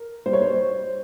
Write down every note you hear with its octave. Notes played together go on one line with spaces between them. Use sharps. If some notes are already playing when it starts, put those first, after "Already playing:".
Already playing: A#4
G3 C5
C#5
C5